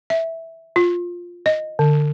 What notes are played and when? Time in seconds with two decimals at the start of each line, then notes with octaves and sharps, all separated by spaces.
0.10 E5
0.76 F4
1.46 D#5
1.79 D3